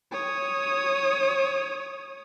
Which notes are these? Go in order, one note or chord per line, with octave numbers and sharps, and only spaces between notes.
C#5 D#6